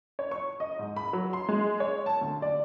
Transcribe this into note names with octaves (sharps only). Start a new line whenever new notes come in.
C#5
C#6
D#5
G#2
B5
F#3
C6
G#3
C#5
A5
D2
D5